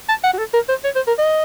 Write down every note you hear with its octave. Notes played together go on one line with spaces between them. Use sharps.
A5
F#5
F#4
A4
A#4
C5
C#5
C5
A#4
D#5